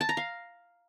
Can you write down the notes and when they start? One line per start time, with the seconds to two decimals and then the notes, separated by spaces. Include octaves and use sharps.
0.01 A5
0.09 A#5
0.17 F5